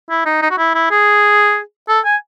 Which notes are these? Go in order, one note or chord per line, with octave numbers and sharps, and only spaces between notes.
E4
D#4
D#4
F#4
E4
E4
G#4
A4
G#5